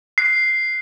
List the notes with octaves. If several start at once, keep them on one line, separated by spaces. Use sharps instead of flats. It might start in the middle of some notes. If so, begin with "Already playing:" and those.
F#6 C7